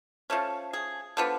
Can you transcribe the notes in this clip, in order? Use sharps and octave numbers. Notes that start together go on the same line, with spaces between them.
F3 A3 C#4
G#4
D3 F3 B3